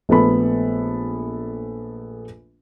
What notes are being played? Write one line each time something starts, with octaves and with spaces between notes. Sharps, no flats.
A#1 A3 B3 A4 B5